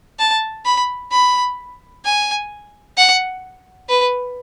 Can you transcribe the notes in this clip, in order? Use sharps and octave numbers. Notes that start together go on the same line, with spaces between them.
A5
B5
B5
G#5
F#5
B4